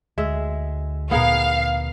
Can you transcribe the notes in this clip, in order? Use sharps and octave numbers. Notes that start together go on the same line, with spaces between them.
D2 G#3 E5
A#2 B3 D#4 G#4 A#4 F5